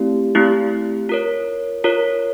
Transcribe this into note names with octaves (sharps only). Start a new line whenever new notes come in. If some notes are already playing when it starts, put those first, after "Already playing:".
Already playing: A3 C4 E4 G4
A3 C4 E4 G4
F4 A#4 C#5
F4 A#4 C#5